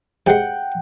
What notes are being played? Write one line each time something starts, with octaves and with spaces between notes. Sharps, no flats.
C3 G#3 F#5 G5